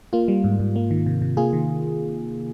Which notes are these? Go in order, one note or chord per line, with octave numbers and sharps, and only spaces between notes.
A#3 F4
G3
G#2
G#2
A#3
D#3
C3
C3
A#3 F4 G#4
D#3